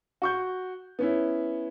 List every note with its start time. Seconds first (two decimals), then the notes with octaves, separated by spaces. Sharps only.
0.22 F#4 C#6 G6
0.99 B3 C#4 E4